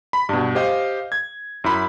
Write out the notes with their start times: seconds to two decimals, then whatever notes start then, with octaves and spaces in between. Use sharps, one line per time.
0.13 B5
0.29 G2 B2
0.55 G4 C5 D#5 F5
1.12 G#6
1.64 F#2 E4 B5